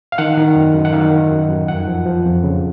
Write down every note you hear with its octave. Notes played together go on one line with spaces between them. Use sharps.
F5
D#3 F#5
D#3
F#2
F#2
F#5
D#3 F5
D#3
F#2
F#2
F2 F#5
F3
F3
F2
C#3